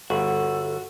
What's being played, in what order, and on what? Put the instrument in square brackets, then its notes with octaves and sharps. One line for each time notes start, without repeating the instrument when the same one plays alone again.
[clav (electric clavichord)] G1 [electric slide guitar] F#4 [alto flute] A4